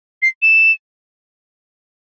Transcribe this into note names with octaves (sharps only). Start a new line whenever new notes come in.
C7
E7